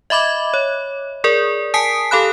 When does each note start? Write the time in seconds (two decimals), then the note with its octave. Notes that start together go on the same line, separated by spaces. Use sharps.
0.10 D#5 E5 B5 D6 G#6
0.54 C#5
1.24 G#4 A#4 D5
1.74 G#5 A5 D#6 B6 C7 D7
2.11 G4 A4 F5 B5 F#6